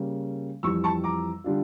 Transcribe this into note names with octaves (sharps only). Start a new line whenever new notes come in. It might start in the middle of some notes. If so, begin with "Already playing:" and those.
Already playing: C#3 G3 A#3
F2 E3 G3 C#6 E6
A5 C#6
A#5 D6
D3 G3 D4 F4